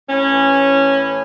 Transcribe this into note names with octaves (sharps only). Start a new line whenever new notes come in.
A2 C#4
E3
A2
E3
A2